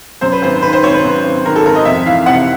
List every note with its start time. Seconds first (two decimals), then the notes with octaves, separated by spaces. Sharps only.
0.21 F#2 C5
0.33 B4
0.42 G#1 C5
0.62 D#3 B4
0.73 C5
0.83 G#1 C#5
0.94 B4
1.04 F#2
1.24 G#1
1.45 D#3 A#4
1.56 A4
1.65 G#1 A#4
1.75 D#5
1.85 F2 E5
2.06 E3 F5
2.26 C3 F#5